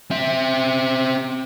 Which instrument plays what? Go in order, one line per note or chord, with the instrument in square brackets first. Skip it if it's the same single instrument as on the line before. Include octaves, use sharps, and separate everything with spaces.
[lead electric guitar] C4 E5